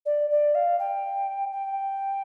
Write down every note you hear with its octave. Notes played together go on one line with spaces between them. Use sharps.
D5
D5
F5
G5
G5